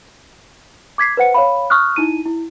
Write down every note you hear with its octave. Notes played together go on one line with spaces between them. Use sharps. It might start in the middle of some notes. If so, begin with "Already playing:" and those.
D6 G#6 B6 C7
B4 C5 F#5 C#7
C#5 F5 B5
C#6 D#6 F6 F#6
D#4 E4 D#7
E4